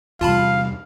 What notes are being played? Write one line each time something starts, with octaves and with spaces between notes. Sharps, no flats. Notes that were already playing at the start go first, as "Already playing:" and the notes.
E2 C3 G3 F4 F5 A5 B5